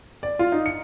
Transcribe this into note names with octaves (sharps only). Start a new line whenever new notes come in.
D5
F4
D#4
C#7